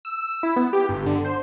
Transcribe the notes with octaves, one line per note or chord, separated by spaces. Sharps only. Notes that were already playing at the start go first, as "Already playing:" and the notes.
E6
E6
E4
B3
G4
G1
D3
C5